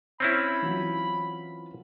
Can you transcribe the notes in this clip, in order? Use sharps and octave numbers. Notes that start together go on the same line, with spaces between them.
C4 C#4 E4 B5
E3 F#3 F4